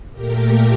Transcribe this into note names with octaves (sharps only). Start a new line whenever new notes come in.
A#2 A3 G4 A#4